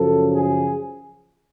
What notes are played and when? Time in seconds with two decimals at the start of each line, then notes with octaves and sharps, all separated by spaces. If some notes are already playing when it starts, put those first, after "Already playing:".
Already playing: F#2 C#3 F3 A4
0.31 G#4